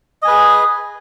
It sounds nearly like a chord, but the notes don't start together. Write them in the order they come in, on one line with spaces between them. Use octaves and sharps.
D#5 G#5 B4 G#4